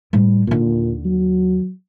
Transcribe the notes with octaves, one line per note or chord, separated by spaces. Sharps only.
A2 G3
D#2 A#2 D3
F#3